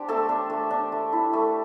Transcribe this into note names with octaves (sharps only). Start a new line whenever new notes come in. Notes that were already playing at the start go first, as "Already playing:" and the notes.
Already playing: D4 G4 C5
A3 A4 A5
D4
A3
D4
A3
E4
A3